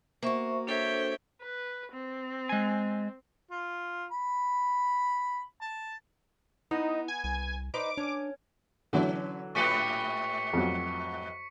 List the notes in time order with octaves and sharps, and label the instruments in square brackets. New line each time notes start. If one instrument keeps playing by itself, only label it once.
[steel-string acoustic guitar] A#3 F#4 [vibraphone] C5 E5 C#6
[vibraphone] D4 A4 C5 [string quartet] C#5 E5 G5
[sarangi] B4
C4
[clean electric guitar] G#3 G#5
[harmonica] F4
B5
A5
[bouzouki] B3 [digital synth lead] D#4 [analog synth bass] E4
[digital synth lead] G#5
[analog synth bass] C2 [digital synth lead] G#5
[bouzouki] D#4 B4 C5 [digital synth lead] D6
[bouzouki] C#4 [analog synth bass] D4
[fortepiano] D3 E3 F#3 [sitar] C#4
[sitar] G#2 G4 B4 [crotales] C#6 B6 C#7
[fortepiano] F2 F#3